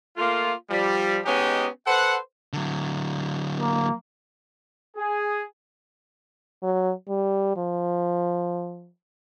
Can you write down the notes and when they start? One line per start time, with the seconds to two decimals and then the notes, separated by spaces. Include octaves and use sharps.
0.17 A3 A#3 F4
0.70 F3 G3
1.25 G#3 B3 C#4 D#4 G4
1.87 A4 B4 C5 F#5
2.53 D3 F#3
3.59 A#3
4.97 G#4
6.63 F#3
7.09 G3
7.57 F3